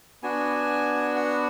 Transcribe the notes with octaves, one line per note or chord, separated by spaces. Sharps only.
B3 D4 F#4 G#5
F#5